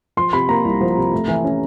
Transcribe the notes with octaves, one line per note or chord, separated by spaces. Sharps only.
F3 C6
C3 B5
A#3 A#5
C2
F3
C3
A3
E3
C#4